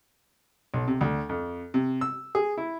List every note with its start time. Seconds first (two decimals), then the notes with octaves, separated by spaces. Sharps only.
0.74 B1
0.88 C3
1.01 D2
1.29 F2
1.74 C3
2.01 E6
2.35 G#4
2.58 E4